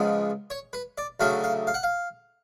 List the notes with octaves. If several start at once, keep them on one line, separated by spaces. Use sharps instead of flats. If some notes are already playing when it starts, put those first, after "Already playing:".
Already playing: C#2 C#3 F3 G#3 B3
C#5
B4
D5
D2 C#3 F#3 A3 F5
F5
F5
F#5
F5